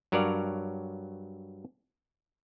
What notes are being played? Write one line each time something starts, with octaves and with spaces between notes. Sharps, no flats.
G2 F#3 A#4 C#5 D5 F5